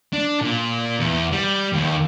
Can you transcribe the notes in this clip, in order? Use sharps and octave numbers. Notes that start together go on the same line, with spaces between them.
D4
A#2
E2
G3
D#2